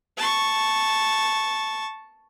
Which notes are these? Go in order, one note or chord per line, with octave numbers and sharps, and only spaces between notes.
A5 C#6